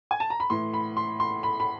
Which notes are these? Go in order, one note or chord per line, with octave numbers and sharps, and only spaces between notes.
G#5
A5
A#5
B5
A2 E3 C6
B5
C6
C6
B5
B5